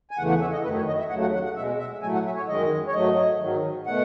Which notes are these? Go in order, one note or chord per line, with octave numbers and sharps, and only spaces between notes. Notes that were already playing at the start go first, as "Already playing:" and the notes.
G#5
E2 C#3 E3 A3 F#5
F#5
E5
D#5
F#2 D#3 A3 B4
C#5
D#5
E5
D#2 C#3 F#3 A3 F#5
F#5
F#5
F#5
B2 G#3 E5
E5
A2 F#3 A3 G#5
F#5
E5
C#5
F#2 D#3 G#3 D#5
C#5
G#2 F#3 A3 D#5
G#2 D#3 F#3
B2 A3 F#5